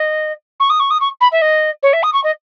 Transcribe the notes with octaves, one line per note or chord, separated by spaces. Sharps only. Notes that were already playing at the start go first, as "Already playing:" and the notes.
Already playing: D#5
C#6
D#6
C#6
D#6
C#6
B5
E5
D#5
C#5
E5
D#6
C#6
D#5